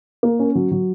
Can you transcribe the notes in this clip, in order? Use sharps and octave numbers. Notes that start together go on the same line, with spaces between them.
A#3
C#4
F#3
F#3